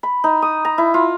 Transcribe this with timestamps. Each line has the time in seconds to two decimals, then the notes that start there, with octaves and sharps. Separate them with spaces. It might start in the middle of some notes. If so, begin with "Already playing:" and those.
0.03 B5
0.24 D#4
0.42 D#6
0.65 A#5
0.78 E4
0.94 F4